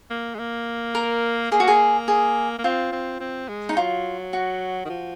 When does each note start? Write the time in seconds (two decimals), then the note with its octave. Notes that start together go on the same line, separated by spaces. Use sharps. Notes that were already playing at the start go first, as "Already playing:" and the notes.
0.10 A#3
0.35 G#3
0.39 A#3
0.95 A#4
1.51 A#3 G#4
1.60 F#4
1.68 G#4
2.08 G#4
2.59 A#3
2.64 C4 F4
2.92 C4
3.20 C4
3.49 G#3
3.69 D#4
3.77 F#3 F4
4.33 F#4
4.85 D#3
4.90 F3